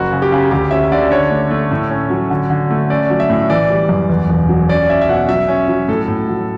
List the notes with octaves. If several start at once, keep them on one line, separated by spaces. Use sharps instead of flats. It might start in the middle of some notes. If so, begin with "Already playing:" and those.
Already playing: F#1 F#4
C#3
G4
C#3
D2 G4
C#4 E5
D3 D5
D4 C#5
A3
A3
A2
C#4
F#3
D3
D3
A3
C#4 D5
F#3
E5
A2
E3 D5
G3
F#2
E2
E1
F#3
C#4 D5
C#4 E5
E5
B2 F#5
F#3 E5
C#4
F#3
A2 A4
A2
F#3